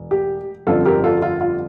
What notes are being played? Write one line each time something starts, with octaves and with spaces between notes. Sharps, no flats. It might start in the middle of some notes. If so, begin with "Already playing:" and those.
Already playing: E1
G4
G1 F2 D3 F3 C#4 F4 A4
G4 A#4
F4 A4
F4
F4